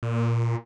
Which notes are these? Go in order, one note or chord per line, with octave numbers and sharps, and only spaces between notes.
A#2